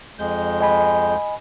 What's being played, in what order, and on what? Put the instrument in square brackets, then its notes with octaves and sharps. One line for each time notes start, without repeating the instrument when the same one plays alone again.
[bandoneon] F2 G#3 G6
[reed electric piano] D#5 G#5 B5